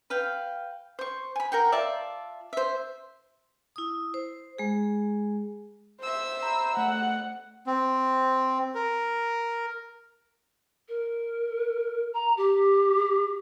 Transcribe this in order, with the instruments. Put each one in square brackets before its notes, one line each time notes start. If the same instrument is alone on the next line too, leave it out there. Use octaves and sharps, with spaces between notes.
[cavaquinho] B4 F5 G5
C5 C#6
G#5 B5
A#4 F#5 G5
F4 D5 E5 A5
C5 E5
[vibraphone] E4 D#6
C5
G#3 G#4
[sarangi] C5 [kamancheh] E5 E6
[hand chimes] A#5 B5
[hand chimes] A3 [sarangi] F#5
[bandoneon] C4
A#4
[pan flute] A#4
A#5
G4